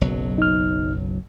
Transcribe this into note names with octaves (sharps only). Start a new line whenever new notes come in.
F#1 B1 F#3
D#4 F6